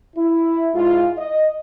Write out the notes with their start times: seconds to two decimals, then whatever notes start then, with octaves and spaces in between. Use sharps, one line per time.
0.16 E4
0.74 G#2 E4 F4
1.18 D#5